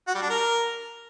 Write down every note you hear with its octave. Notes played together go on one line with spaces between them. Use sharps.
F#4
G3
D4
A#4